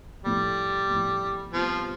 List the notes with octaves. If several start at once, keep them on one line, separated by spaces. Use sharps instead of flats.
A2 F3 G3 A3
A2 F3 A3
C3 F3 G3 B3 F4